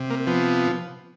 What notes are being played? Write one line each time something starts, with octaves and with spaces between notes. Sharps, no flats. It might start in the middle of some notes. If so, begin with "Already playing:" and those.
Already playing: C3
A#3
F3 B3